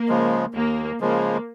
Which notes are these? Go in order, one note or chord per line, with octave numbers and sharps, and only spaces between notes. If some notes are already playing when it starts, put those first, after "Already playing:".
Already playing: A#3
C#3 F3 G#3
D#2 A#3
C#3 F3 G#3 A#3